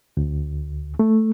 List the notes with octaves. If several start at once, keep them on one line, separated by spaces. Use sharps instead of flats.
D2
A3